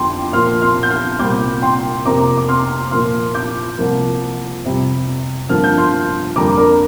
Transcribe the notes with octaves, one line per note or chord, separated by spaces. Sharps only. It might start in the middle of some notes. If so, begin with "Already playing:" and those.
Already playing: F2 D3 F3 G5 C6 D6
A#2 F3 A#3 C6 F6
C6 F6
G6
C6 F6
C2 A#2 G3 C4 D6 G6
G5 C6
F2 C3 A#3 A#5 D6
D6
C6 F6
A#2 F3 A#3 C6 F6
D6 G6
C2 C3 F3 A#3
F2 C3 G3
G2 D3 F3 A#3 F6
G6
C6 F6
F2 D3 G3 A#3 A#5 D6
A#4 D5